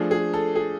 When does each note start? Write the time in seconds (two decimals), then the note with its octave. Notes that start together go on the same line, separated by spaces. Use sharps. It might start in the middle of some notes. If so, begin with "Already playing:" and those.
Already playing: F3 A3 D4 G#4
0.11 G#4
0.34 A4
0.55 G#4